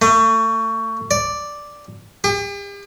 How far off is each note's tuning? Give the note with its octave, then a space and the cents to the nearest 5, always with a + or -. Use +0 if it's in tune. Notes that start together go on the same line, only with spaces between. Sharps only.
A3 +30
D5 +0
G4 +40